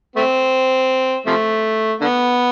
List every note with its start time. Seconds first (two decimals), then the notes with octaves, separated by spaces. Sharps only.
0.16 A3 C4
1.26 C3 F3 A3
2.01 D3 B3